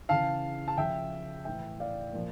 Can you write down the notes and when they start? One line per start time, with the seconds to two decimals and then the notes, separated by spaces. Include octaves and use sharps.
0.09 C#3 E3 F5 A5
0.68 A5
0.78 C#3 F3 E5 G5
1.45 A2 E3 E5 G5
1.80 D5 F5
2.13 A#2 F3